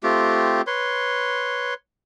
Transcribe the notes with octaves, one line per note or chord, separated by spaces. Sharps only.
A3 C4 F4 G4
B4 C#5 C6